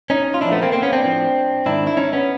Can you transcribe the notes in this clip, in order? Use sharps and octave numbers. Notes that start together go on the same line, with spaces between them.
C#4 D#4
F4
A#2 F3 D4 E4
A3 B3
A#3 C4
A#3 C4
B3 C#4
C4 D4
A2 F3
G#2 D#3 D4 E4
E4
C#4 D#4
B3 C#4